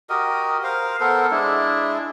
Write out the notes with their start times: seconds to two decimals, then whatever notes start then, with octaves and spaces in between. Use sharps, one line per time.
0.10 F#4 G4 A#4 D#5
0.64 A#4 C5 F5
1.00 B3 A4 A#4 C5
1.31 G#3 D4 E4